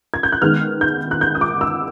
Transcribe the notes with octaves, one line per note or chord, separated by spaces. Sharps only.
G#6
G6
F#6
D#3 G#3 B3 F6
G6
F#6
G6
D#6
D6
E6